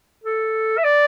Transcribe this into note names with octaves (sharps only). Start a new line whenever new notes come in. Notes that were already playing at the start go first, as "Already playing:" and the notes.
A4
E5
D5